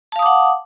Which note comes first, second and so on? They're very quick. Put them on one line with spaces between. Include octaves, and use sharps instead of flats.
A5 F5 D#6 D6 F#5